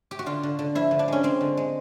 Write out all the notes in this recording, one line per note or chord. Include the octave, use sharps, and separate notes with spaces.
G4
F#4
D3 F4
D3
D3
F3 E4
D3
D4
G#3 C#4
G#3 C4
D3
G#3